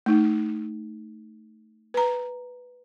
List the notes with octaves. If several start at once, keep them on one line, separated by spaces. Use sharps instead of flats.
A3 D#4
B4 A#5